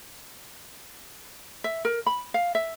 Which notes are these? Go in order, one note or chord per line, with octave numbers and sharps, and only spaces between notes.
E5
A#4
B5
F5
E5